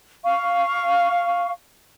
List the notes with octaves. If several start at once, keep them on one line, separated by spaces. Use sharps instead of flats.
F5 C#6